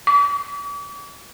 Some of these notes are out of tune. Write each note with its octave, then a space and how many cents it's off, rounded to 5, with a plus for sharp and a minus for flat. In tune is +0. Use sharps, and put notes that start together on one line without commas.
D6 -45